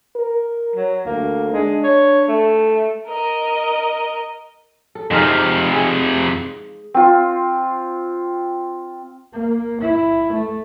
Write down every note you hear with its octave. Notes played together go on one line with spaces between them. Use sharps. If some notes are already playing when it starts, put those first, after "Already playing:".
A#4
F#3
D2 A#3
G#3 D4
C#5
A3
A#4 D#5
A4
F2 C3 G#3 D#4 F5
G#4
C4 F4
A#3
E4
A3